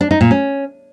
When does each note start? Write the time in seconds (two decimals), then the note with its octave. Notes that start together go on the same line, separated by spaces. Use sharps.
0.01 D4
0.11 D#4
0.21 A#2
0.31 C#4